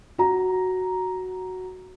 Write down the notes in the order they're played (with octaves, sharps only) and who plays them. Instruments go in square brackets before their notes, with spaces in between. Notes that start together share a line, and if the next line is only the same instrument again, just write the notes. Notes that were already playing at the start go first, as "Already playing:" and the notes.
[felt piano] F#4 A#5